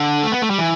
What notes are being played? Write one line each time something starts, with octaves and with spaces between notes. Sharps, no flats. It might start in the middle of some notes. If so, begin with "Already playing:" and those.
Already playing: D3
A3
B3
A3
G3
E3